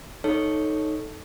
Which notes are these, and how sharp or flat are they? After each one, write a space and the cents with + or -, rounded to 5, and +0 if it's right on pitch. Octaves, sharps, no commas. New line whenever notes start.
D#4 +0 A4 +0 C#5 +0